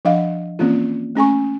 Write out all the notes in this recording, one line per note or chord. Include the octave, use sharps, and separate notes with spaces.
F3 D4 D#5 F5 F#5
E3 A#3 C4 C#4 F4
A3 C#4 G#5 C#6